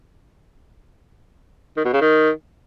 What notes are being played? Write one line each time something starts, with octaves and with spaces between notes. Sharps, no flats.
D#3
B2
C#3
D#3